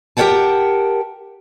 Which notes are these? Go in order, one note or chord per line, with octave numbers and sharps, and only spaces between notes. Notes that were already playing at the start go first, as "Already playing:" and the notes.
G4 A#4 C#5 F#5 G5 A5